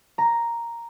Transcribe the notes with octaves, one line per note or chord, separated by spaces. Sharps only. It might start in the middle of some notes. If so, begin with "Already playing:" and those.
A#5